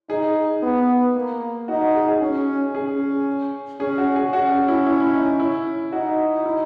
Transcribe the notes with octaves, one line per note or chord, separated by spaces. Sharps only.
D#4 G#4
B3
A#3
D#4 F#4
F#4
G#4
G#4
C#4
C#4 G#4
C#4 G#4
F#4
G#4
C#4 F#4
F#4
E4
E4
E4
D#4
E4
D#4 F#4
E4